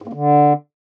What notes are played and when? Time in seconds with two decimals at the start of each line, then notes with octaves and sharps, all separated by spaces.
0.02 G#2
0.08 A#3
0.13 D3